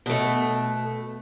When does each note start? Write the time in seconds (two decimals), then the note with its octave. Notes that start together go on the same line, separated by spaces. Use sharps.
0.06 B2 A3